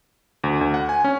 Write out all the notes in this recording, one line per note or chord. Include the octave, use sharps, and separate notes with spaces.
D2
D2
F#5
G#5
C#4